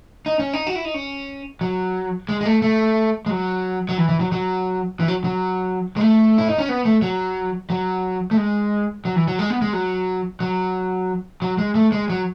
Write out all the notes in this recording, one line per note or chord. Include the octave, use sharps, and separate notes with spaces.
D#4
C#4
D#4
F#4
E4
D#4
C#4
F#3
G#3
G#3
A3
A3
G#3
F#3
F#3
E3
E3
F#3
F#3
E3
F#3
F#3
G#3
A3
E4
D#4
C#4
B3
A3
F#3
F#3
A3
G#3
F#3
E3
F#3
G#3
B3
G#3
F#3
F#3
F#3
G#3
A3
G#3
F#3